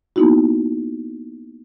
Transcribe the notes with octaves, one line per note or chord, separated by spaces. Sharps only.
A#3 B3 D#4 E4 F#4